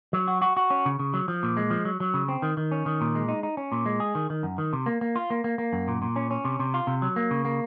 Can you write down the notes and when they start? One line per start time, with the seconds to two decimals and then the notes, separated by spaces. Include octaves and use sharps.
0.13 F#3
0.28 F#4
0.42 F#4
0.57 F#4
0.70 C#4
0.86 C#3
1.00 C#3
1.14 F#3
1.28 F3
1.43 A#2
1.57 G#3
1.70 F3
1.85 F#3
2.00 F#3
2.14 C#3
2.29 C4
2.42 D#3
2.57 D#3
2.72 C#4
2.86 D#3
3.01 A#2
3.15 G#3
3.28 D#4
3.43 D#4
3.57 C#4
3.72 A#2
3.86 G#3
4.00 G#4
4.15 D#3
4.30 D#3
4.43 F#2
4.58 D#3
4.73 C3
4.86 A#3
5.01 A#3
5.16 F4
5.30 A#3
5.44 A#3
5.58 A#3
5.73 F#2
5.88 A#2
6.02 A#2
6.16 C#4
6.31 C#4
6.45 C3
6.60 C3
6.74 F4
6.87 C3
7.02 F#3
7.16 A#3
7.31 C#3
7.45 A#3